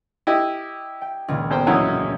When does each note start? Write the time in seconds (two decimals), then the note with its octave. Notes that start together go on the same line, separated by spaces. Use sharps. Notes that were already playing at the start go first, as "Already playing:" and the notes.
0.27 E4 G4 D#5
1.01 G5
1.28 C#2 A#2 D#3
1.50 E2 C5 G5
1.67 E1 F#2 F#3 E4 D#6